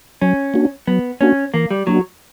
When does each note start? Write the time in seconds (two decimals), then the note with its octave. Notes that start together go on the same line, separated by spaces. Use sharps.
0.22 F#3 C#4
0.54 A#3 D4 F#4
0.87 F#3 B3
1.21 A#3 C#4 D4 F#4
1.54 E3 A#3
1.71 G3
1.87 F#3 A#3 D4 F#4